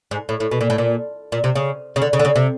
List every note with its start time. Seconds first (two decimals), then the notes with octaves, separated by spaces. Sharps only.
0.11 G#2
0.29 A2
0.40 A2
0.51 B2
0.61 A#2
0.70 A2
0.78 A#2
1.32 A#2
1.44 C3
1.56 C#3
1.96 C#3
2.02 D3
2.13 C#3
2.20 D3
2.25 C#3
2.36 C3